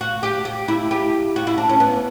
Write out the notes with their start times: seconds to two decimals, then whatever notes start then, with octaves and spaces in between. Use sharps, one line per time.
0.01 F#4
0.23 G4
0.45 G4
0.68 E4
0.91 G4
1.36 F#4
1.47 E4
1.58 D4
1.69 C#4
1.80 B3